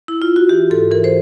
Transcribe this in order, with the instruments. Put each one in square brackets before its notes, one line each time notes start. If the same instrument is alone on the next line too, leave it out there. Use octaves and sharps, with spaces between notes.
[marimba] E4
F4
F#4
E3 G4
G#2 A4
E3 A#4
C5